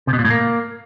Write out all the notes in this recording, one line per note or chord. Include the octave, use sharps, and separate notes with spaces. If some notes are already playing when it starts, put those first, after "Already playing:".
C3
B2
A#2
A2
A#3